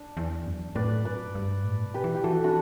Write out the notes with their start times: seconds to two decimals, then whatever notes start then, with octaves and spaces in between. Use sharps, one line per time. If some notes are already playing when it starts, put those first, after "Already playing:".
Already playing: D4
0.17 E2
0.46 F#2
0.75 A2 B4 D5
1.05 F#2 B4 D5
1.35 G2
1.64 A2
1.85 B2
1.94 G4 B4
2.04 E3
2.15 G4
2.24 E3 F#4 A4
2.44 D4 F#4